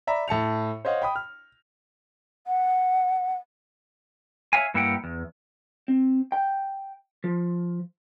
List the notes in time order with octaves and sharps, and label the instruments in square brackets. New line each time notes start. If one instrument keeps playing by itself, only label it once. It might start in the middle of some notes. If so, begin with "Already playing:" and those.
[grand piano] D5 E5 A#5 B5
A2 A5 C#7 F7
C5 C#5 D#5 F5 F#5
G5 B5 D#6
F6
[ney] F#5
[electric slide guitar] C#5 E5 F5 G#5
G2 A#3 E4 G4 F#5 G5
E2
[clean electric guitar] C4
G5
F3